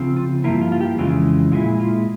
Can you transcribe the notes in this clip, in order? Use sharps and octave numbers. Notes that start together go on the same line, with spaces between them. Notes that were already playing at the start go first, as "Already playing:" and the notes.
Already playing: C#3 F3 C4
F4
G2 F3 A#3 E4 F4
F4
F4
G4
F2 C#3 E3 G#3 F4
A#2 G#3 E4 F4
F4